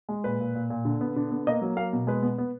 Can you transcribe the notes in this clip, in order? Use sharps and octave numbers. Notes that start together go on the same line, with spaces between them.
G#3
A#2 B4
A#2
A#2
A#2
D3
B3
D3
B3
A#3 D#5
F#3
A#3 F5
B2
G#3 B4
B3
B3